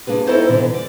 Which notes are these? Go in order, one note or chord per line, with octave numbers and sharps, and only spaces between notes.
A#3 D4 G#4 B4
C4 D#4 E4 A4 C5 C#5
B2 D3 E3
D5